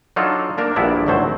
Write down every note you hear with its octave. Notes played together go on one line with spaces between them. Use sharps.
F#3 D4 D#4 F4 A4 C#5
A#3 D4 A#4
A#1 G2 B3 D4 E4 D5
G#1 D2 F#3 A3 C5